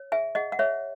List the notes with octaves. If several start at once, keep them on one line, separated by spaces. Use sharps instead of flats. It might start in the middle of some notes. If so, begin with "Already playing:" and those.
Already playing: C#5
G#4 E5 G#5
G#4 D#5 F#5
F#5
G#4 C#5 E5